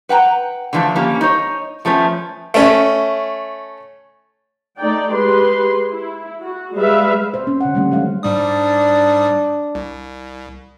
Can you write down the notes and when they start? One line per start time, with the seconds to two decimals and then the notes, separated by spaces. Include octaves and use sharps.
0.09 B4 F#5 G5 A#5
0.73 D3 E3 F3 A3 A4
0.95 D3 G3 A#3 C#4
1.21 D#4 C#5
1.85 F3 A3 B3 C#4
2.54 A3 C#4
4.79 A3 D#4 D5 G5
5.14 G#3 G4 B4 C6
5.90 E4
6.41 F#4
6.75 G3 G#3 B4 E5 F5
7.34 C5
7.47 C#4
7.61 D3 F#5
7.74 D#3 G3 A3 C#4
7.91 F#3 G#3 C#4 F5
8.23 G#2 G3 D4 D#6
9.75 C2